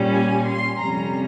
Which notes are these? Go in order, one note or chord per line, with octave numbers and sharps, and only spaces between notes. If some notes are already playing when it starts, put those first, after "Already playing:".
Already playing: A#2 G3 C#4
G#5
C6
F2 C3 G3 C#4 A#5